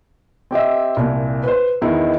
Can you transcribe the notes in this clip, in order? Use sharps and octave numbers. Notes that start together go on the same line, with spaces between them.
C4 G4 D#5 E5
C2 A#2
B4 C5
E2 D#3 D#4 E4